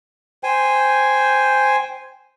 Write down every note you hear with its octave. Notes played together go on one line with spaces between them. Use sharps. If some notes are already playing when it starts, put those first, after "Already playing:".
C5 G5 G#5